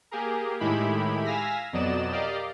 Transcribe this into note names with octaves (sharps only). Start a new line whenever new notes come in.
A#3 G4 G#4 A#4
A2 D#3 G#3 E4 G4 B5
F5 G#5 E6 F6 A#6 B6
F2 B2 F#3 D5 D#5 E7
G4 A#4 D5 D#5 F5